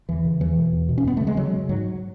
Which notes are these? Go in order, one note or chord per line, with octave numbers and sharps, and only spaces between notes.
E2 E3
C#3
E2 E3
B2
E2
B2
C#4
F#2 B3
C#3 A3
G#3
F#2 F#3
C#3
G#2 F#3